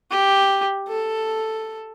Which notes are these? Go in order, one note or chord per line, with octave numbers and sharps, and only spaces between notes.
G4
A4